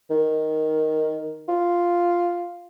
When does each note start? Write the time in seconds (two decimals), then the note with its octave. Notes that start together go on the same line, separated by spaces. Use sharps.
0.10 D#3
1.48 F4